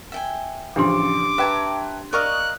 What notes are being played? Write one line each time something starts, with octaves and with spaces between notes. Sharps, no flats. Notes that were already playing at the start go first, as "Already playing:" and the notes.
E5 G5 G#5
A1 C#3 F3 D4 G4 C6 D6
B4 E5 G5 A5 A#5 G#6
A#4 D5 D#5 F5 C#6 D#6 F#6